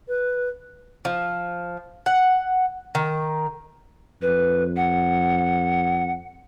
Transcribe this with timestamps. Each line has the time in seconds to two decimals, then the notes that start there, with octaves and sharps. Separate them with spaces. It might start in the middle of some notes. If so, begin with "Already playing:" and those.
0.08 B4
1.05 F3
2.06 F#5
2.95 D#3
4.22 F2 B4
4.77 F#5